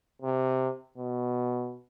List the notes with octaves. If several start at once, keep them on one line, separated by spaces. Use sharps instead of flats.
C3
B2